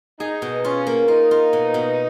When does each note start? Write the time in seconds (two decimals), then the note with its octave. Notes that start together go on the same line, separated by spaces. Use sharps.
0.19 D#4 G#4
0.42 B2
0.64 C#4 F4
0.87 A#3
1.08 D#4 F4
1.31 F4
1.53 B2
1.74 B2